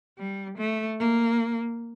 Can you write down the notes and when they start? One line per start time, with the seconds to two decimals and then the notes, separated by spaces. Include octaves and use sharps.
0.18 G3
0.58 A3
0.99 A#3